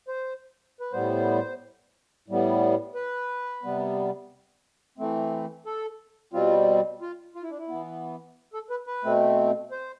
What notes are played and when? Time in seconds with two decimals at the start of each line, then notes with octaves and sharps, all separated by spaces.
0.08 C5
0.80 B4
0.92 A2 G3 B3 C5
2.28 A2 G3 B3
2.95 B4
3.63 C3 G3 B3
4.98 E3 A3 C4
5.66 A4
6.33 B2 G3 C4 F4
7.01 F4
7.35 F4
7.43 E4
7.50 D4
7.58 E4
7.69 E3 B3
8.54 A4
8.70 B4
8.87 B4
9.04 B2 A3 C4
9.71 C5